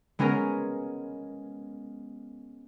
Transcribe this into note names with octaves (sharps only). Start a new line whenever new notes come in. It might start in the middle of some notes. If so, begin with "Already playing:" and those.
G#3 B3 C#4 G#4 A#4